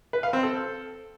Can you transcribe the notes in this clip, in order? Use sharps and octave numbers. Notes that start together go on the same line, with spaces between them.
B4
F5
C4
A4